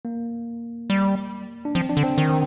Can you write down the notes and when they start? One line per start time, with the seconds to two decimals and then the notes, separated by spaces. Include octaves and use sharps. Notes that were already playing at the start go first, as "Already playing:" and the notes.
0.05 A#3
0.90 G3
1.65 D4
1.75 F3 C4
1.89 D4
1.97 D3
2.04 C4
2.18 D#3 C4
2.29 C4